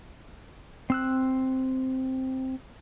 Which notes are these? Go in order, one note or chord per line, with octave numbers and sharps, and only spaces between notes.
C4 E6 F#6